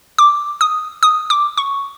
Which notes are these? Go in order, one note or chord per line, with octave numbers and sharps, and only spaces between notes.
D6
D#6
D#6
D6
C#6